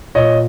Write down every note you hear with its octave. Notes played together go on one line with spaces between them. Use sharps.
A#2 C#5 D#5